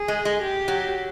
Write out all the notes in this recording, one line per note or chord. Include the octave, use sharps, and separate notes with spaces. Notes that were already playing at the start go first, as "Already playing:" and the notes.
Already playing: G#4
G#3
G#3
G4
F#3